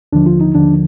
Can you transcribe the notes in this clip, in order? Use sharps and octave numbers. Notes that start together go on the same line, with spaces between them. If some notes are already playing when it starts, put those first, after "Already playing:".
D#2 D3 F3 D4
F4
D#4
D#2 D3 F3 D4